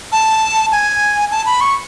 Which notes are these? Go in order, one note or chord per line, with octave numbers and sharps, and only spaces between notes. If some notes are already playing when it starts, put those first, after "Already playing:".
A5
G#5
A5
B5
C#6